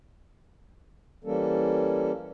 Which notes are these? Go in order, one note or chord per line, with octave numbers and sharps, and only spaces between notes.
E3 G3 A#3 C#4 A4